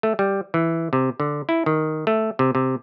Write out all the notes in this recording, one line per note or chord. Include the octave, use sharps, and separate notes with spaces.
A3
G3
E3
C3
D3
E4
D#3
A3
C3
C3